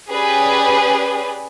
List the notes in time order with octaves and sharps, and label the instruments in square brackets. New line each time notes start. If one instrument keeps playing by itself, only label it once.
[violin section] C#4 G4 G#4 B4 D5